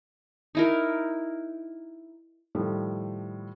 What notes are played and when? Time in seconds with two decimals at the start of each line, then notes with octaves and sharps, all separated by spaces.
0.55 D#4 E4 A#4
2.55 A2 D#3 F3 G3